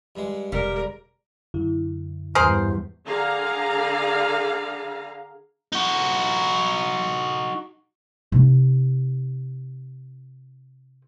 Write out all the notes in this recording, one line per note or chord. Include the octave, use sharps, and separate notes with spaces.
G2 G#3
E1 D3 G3 A#4
F#2 D3 E4
E2 G2 G#4 A#4 C5
D3 G#4 F5 A#5
D#4 F#4
C3 D#4